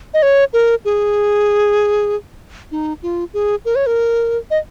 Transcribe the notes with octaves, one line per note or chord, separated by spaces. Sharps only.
D#5
C#5
A#4
G#4
D#4
F4
G#4
A#4
C#5
A#4
D#5